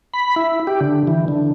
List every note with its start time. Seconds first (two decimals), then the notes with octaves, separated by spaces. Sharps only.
0.14 B5
0.36 E4
0.67 G4
0.81 D3
1.07 E3
1.28 D3